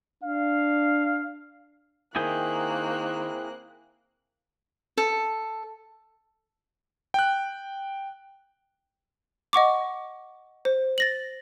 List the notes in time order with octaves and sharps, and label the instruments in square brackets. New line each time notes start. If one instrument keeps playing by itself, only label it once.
[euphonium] D4 [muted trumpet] F5
[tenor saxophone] D#3 [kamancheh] A#3 F#6 [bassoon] C4 [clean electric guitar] E4 G#4 G5
[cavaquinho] A4
[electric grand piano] G5 F#6
[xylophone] D#5 F#5 C#6 D6
C5
A6 A#6 F#7